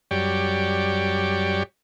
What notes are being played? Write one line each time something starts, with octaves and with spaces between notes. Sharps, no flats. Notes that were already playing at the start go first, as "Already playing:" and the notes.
F#2 G3 G4 C#5 D5